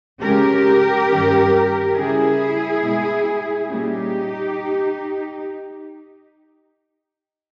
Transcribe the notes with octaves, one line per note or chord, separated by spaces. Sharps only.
C#3 G#3 C#4 G4 A#4
G2 D#3 G3 C#4
C#3 G3 C#4 E4 G#4
B2 G#3 B3
A#2 G3 A#3 C#4 D#4 G4